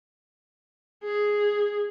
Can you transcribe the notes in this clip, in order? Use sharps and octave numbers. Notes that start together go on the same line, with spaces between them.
G#4